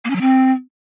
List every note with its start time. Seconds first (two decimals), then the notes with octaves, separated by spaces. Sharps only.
0.05 A#3
0.10 C#4
0.15 F#3
0.21 C4